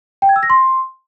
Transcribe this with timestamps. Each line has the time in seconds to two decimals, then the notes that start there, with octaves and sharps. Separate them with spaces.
0.22 G5
0.29 G#6
0.36 E6
0.43 A#6
0.50 C6